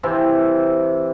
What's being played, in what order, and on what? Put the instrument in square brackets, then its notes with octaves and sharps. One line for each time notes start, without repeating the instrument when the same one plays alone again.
[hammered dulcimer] C3 E3 C4